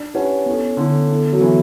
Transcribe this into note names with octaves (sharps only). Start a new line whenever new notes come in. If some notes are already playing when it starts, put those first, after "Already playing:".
Already playing: D4
C#4 E4 G4 B4 F#5 A5
B3 E4 A4
D3 B3 E4 A4
B3 E4 A4
F#3
E3 B3 E4 A4